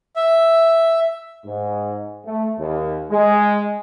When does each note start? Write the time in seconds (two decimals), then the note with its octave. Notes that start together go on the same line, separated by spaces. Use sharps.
0.16 E5
1.46 G#2
2.26 A3
2.59 D#2
3.11 G#3